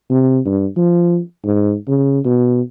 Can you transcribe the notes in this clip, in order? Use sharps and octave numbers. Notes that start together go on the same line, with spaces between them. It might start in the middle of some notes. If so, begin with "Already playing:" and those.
C3
G2
F3
G#2
C#3
B2